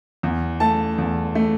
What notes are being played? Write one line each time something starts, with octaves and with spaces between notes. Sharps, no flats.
E2
A3 A5
E2
A3